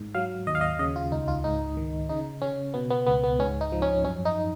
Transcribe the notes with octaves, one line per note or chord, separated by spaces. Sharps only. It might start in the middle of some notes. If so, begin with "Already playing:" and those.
Already playing: G#2
F#3 F5
D#2 D#5
F5
D#5
C#3 D#5
F4
C#2 D#4
F4
G#2 D#4
D#3
C#3 D#4
C#3 C#4
B2 B3
B3
C#2 B3
B3
G#2 C#4
D#4
F3
C#4
F#2 C#4
D#4